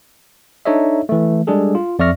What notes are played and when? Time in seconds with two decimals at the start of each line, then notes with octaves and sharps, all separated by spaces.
0.65 D4 D#4 A4 C#5 D#5 E5
1.09 E3 A3
1.47 G3 G#3 D4 G#4 A4
1.75 F4
1.99 F2 D5 E5 C#6 F6 A#6